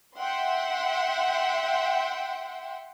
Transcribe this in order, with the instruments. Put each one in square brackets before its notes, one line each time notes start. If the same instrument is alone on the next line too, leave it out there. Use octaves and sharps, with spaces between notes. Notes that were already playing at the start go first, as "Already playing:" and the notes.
[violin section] E5 F#5 G5 C6